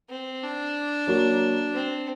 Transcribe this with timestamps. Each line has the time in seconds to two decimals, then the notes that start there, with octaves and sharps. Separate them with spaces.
0.09 C4
0.43 D4
1.07 F#3 A#3 F#4
1.73 C4